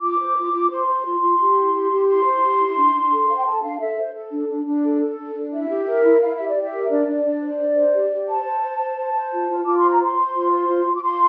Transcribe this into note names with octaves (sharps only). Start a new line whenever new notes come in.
F4 D6
C5
F4
F4
C5 C6
C5
F4
F4
G4
E4
G4
G4
E4 C6
C5
G4
E4
D4
D4
A4
C5 F5
G5
A4 A5
D4 F5
A4 E5
C5
A4
D4
D4
D4
A4
A4
D4
D4
E4 E5
G4
A#4
E4
E4 F5
G4 E5
D5
G4
E5
A#4
D4 D5
D4
D4
C5
D4
C5
G4
G4
C5 A5
C5
C5
C5
C5
C5
F4
F4
F4 D6
C5 C6
A#5
C5 C6
C5
F4
C5
F4
F4
D6
F4 C6